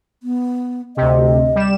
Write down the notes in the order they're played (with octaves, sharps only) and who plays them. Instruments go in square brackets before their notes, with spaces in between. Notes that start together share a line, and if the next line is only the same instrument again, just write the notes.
[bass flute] B3
[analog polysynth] D2 C3 [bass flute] D#5
[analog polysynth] G3 E7